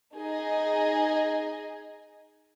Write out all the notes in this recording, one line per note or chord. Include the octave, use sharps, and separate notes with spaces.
D#4 G#4 D#5